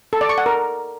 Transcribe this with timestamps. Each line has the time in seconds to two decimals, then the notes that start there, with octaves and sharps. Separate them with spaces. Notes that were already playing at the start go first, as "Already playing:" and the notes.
0.13 A4
0.21 D5
0.29 C#6
0.38 F#5
0.46 A#4